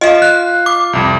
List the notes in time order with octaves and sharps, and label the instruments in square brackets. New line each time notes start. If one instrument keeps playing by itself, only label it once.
[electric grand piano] F4 [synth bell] D#5 F5
[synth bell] F#6
D6
[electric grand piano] C2 F2